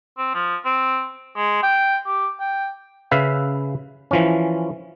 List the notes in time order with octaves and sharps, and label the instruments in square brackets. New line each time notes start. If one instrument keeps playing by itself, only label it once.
[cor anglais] C4
F3
C4
G#3
G5
G4
G5
[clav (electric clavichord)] C#3 B4 E5 F5
E3 F3 C#4